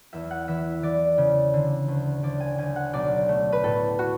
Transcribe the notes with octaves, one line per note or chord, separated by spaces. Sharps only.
E2 E5
F#5
E3 E5
E3 D5
C#3
D3
D2
D2 D5
G#5
D2 G#5
F#5
B1 D5
A3
B4
A2 A4
F#4